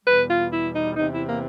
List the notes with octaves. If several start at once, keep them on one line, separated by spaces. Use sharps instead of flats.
E2 B2 G3 B4
F4
E4
D#4
E2 C3 E3 D#4
E4
A#3